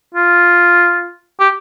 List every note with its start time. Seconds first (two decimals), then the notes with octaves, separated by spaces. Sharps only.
0.14 F4
1.40 G4